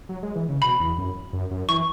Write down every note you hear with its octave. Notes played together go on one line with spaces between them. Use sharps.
F#3
G#3
E3
C#3
B2 B5
E2
F#2
F#2
F#2
E3 C#6